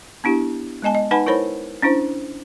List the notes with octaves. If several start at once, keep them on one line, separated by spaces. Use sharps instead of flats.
B3 D4 E4 G4
G#3 B3 D#5 G#5 A5
D#5
D#4 B4 F#5 G#5 A5 B5
E4 A#4 C5 C#5 B5
C#4 D4 E4 C5